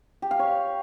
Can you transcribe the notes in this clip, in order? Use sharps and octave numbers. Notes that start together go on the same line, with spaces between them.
G4
F5
C#5